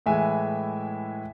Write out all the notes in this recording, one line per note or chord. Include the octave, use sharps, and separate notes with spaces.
A2 E3 G#3 E5 G#5